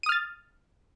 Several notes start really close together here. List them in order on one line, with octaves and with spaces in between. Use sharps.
D#7 D#6 F6 A6